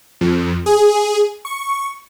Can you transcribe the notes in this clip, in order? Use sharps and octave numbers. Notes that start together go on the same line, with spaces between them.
F2
G#4
C#6